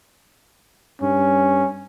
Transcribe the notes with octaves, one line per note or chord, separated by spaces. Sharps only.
G2 C#4